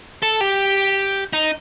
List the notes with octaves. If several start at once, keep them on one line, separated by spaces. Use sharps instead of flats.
A4
G4
D#4